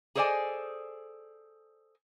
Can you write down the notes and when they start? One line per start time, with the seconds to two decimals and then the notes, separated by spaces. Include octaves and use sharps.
0.15 G#4 A4 C5 D5 D#5 G#5